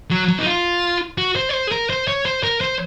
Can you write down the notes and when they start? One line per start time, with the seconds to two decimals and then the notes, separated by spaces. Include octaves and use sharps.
0.11 F#3
0.28 F#3
0.39 D#4
0.46 F4
1.18 F#4
1.36 C5
1.49 C#5
1.53 C5
1.67 G#4
1.72 A#4
1.90 C5
2.08 C#5
2.25 C5
2.44 A#4
2.61 C5